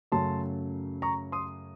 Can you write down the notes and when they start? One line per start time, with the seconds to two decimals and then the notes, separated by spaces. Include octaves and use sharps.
0.12 F#2 C#3 F#3 A3 A5 C6
1.02 A#5 C#6
1.32 C6 D#6